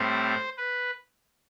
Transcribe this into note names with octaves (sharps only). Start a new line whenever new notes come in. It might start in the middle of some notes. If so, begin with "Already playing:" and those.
Already playing: A2 G3 C4 C5
B4